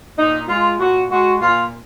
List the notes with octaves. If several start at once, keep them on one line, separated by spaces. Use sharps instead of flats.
A#2 D#4
G#3 F4
A#2 F#4
G#3 F#4
A#2 F4